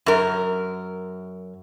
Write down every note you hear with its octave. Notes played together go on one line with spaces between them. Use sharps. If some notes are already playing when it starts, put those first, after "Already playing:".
F#2 A#4